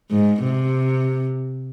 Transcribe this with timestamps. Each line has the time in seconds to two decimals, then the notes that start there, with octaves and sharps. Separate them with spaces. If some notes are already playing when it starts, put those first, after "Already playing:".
0.11 G#2
0.43 C3